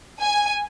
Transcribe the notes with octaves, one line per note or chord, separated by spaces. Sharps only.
G#5